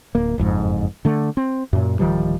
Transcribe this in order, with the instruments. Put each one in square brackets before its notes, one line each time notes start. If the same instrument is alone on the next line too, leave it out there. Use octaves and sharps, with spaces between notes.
[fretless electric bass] D1 A#3
F#1 F2 G#2
D3 A3
C4
F#2 A#2
D1 D#3 F3 G3